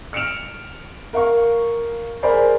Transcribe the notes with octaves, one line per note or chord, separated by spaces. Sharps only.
F6 C#7 D7 E7 F7
A#4 F5 C#6
G#4 A#4 C5 D5 B5